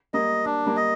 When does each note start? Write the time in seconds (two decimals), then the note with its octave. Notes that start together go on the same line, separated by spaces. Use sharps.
0.13 G3 A#3 D#5
0.45 D4
0.66 G3 A#3
0.77 D#5